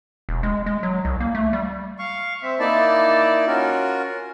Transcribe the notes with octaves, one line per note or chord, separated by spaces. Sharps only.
E1
G#3
G#3
F#3
C2
A#3
A3
G3
F5 C#6
C4 E5
A#3 D#4 E4 D5 A5
C#4 F4 F#4 A#4